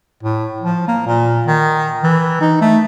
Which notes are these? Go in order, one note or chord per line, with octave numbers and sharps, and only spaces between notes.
A2
F3
A#3
A#2
D#3
E3
D#4
A3